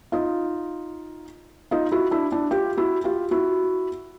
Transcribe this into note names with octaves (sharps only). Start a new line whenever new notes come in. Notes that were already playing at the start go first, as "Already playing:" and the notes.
D#4 F4
D#4 F4
E4 F#4
D4 E4
D4 E4
F4 G4
E4 F#4
F4 G4
E4 F#4